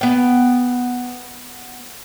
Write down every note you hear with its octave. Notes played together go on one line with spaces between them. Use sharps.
B3 G5